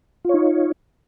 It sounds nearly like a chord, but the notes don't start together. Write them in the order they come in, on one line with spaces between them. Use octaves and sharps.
F4 C#5 D#4